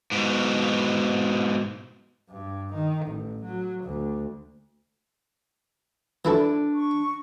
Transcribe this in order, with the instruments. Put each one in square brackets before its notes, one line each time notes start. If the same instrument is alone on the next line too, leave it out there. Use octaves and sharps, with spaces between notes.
[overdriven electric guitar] G#2 B2
[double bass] G2
D#3
A1
F#3
D2
[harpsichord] E3 E4 A4 [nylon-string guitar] D4 D5
[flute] C#6